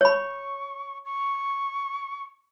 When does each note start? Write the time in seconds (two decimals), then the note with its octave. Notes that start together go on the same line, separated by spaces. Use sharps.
0.01 C#5 B5 C#6
1.05 C#6